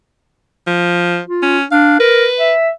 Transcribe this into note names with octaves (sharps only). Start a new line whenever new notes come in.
F3
F4
C#4
D4 F5
A#4 B4
E5